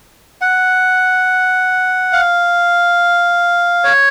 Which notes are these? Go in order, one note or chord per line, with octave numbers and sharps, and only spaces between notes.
F#5
F5
C#5